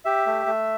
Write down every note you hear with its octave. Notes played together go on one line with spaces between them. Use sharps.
G4 E5
A3
A3